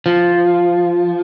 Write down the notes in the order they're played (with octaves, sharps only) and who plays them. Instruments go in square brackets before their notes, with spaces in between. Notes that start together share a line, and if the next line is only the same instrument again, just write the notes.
[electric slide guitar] F3